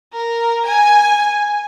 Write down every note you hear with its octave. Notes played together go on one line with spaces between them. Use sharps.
A#4
G#5